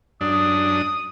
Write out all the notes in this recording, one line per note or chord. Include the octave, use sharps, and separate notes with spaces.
F#2 D4 D#6